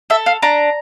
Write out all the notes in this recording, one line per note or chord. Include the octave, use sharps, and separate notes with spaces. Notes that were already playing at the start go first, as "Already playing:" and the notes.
A4 E5
F5
D4 A#5